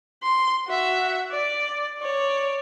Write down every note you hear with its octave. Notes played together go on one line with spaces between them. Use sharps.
C6
F#4 E5
D5
C#5 D5